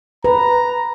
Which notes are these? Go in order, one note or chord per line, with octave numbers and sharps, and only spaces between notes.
B4 A#5